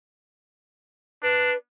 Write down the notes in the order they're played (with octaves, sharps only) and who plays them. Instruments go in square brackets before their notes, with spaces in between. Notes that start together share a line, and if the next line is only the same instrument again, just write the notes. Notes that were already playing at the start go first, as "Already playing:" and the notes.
[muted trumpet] D4 [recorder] B4